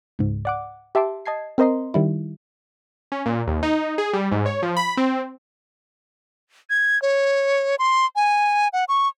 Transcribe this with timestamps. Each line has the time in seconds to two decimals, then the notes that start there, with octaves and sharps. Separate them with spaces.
0.19 C#2 G#2
0.45 D5 F#5 D6
0.95 G4 E5 A5 C6 D6
1.26 D#5 A5 G#6 C7
1.58 C4 A#4 C5 D#5 A#5 C6
1.94 D#3 G3 E4
3.12 C#4
3.26 A#2
3.47 D#2
3.63 D#4
3.98 G#4
4.13 G3
4.32 G#2
4.46 C#5
4.62 F3
4.77 B5
4.97 C4
6.70 G#6
7.02 C#5
7.79 C6
8.16 G#5
8.73 F#5
8.88 C#6